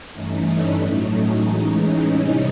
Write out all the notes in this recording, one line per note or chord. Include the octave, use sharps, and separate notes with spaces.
G2 E3 A3 C#4 D#4
D4 E4
A2 F#3 A3
C#4 D#4
A2 E3 G#3
C#4 D#4
C3 E3 G3